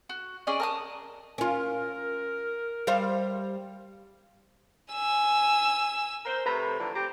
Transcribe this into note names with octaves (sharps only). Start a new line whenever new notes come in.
F#4
C#4 G#4 D5 D#5
A#4 A5 D#6
C#4 F4 A#4
G3 C5 F5
G#5 E6
A#4 C5
C3 A3 B4 A#5 B5
D3 E3 F3
C4 G4 A#5